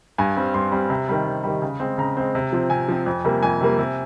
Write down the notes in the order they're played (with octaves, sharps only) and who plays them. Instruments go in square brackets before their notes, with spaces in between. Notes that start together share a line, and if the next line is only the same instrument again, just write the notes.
[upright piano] G2 G#5
G3 C4
G2 C6
G3 C4
C3
D#3 G3
C3
D#3 G3
C#3
G#3 C4
C#3 A#5
G#3 C4
C3
F3 C4
C3 G#5
F3 C4
F2
C3 G3 A#3
F2 G#5
C3 G3 A#3
C3